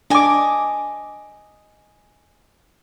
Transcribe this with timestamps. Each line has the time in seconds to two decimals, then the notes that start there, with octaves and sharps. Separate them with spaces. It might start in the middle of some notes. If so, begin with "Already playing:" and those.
0.10 D4 D#5 G#5 D6